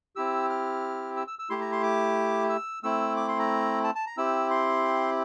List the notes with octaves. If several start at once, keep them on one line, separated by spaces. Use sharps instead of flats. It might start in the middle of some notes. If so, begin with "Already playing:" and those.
C4 E4 G4 E6
F6
E6
E6
E6
A3 E4 G4 C6
A#5
C6
D6
E6
A3 C4 E4 E6
D6
C6
A#5
A5
A5
A#5
C4 E4 G4 E6
C6